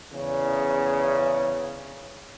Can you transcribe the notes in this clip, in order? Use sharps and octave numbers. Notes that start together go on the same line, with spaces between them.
E2 C#3